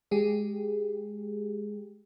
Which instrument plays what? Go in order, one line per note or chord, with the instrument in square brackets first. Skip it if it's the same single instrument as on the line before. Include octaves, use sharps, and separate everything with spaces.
[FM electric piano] G#3 G4 G#4